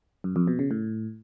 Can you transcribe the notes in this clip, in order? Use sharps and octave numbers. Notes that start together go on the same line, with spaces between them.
F#2
F2
B2
C#3
A2